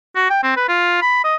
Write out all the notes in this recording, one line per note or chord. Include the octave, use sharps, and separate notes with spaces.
F#4
G5
C4
B4
F4
B5
D#5